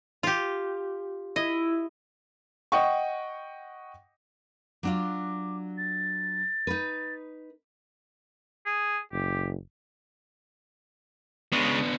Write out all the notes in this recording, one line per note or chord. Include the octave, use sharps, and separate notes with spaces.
F4 G4
E4 D#5
D#5 F#5 G5 C#6
F#3 D4 F4 D6
A6
D#4 B4
G#4
F#1 G4
C#3 G#3 B3 D4